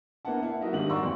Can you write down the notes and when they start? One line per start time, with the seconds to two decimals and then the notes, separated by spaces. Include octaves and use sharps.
0.25 A#3 B3 D4 E4 F#5 A5
0.43 E4
0.61 F#3 D#4 F#4 A#4 D#5 E5
0.73 G#2 D#3 G3 D4 F#7
0.90 D5 F#5 A#5 C6 C#6 E6
1.03 G#1 F2 E3